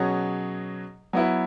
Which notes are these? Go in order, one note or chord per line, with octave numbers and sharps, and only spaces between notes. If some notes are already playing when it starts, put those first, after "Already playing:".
Already playing: B2 F#3 C#4 G#4
F#3 B3 E4 B4